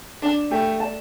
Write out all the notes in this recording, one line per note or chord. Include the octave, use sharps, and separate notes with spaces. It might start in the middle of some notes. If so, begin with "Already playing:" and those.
D4 D5 A5
A3 G4
D5 A5